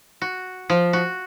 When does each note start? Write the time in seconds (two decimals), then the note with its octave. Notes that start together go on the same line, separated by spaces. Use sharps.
0.22 F#4
0.70 F3
0.93 F#4